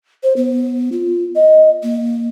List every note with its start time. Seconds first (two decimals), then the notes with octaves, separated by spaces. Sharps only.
0.23 C5
0.36 B3
0.92 F4
1.36 D#5
1.83 A#3